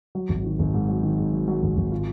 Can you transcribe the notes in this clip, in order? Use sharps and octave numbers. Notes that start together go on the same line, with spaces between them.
F#3
G#1
D#3
G#1
G#2
F#3
D#3
G#2
F#3
F#3
G#1
G#1
F4